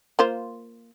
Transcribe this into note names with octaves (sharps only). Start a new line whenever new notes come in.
A#3 F4 C5